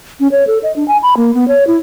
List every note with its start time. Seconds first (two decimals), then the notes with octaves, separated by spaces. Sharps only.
0.20 C#4
0.32 C#5
0.47 A4
0.63 D#5
0.76 D4
0.88 G#5
1.03 B5
1.17 A#3
1.34 B3
1.48 C#5
1.67 E4